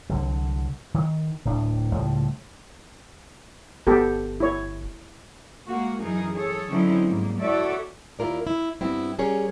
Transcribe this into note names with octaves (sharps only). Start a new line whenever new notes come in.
C2 D3 F#3
D#3
D1 A2 D4
C#2 A2 F3 G3
G1 B3 G4 A4
E4 C#5
G#3 A#3 F#4
F#2 E3 D#4 G#4 A#4
G#4 A4 C#5
D3 F#3 C4 C#4 D#4 E4
G#2 G3 A#3
E4 F#4 A4 C#5 D5 E5
D#2 E4 F4 A#4 D5
E4
G2 B3 C4 E4
G3 C#4 G#4 A#4 C#5